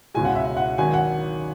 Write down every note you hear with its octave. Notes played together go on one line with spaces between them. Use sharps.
C#2 B2 G#3 G#5
F#5
E5
E5
F#5
G#1 G#2 F#3 G#5
F#5